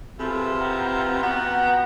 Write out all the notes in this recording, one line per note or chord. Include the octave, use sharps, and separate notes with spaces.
C3 E4 F4 G#4 A4 B4
F#5 G5 A#5
B3 F#4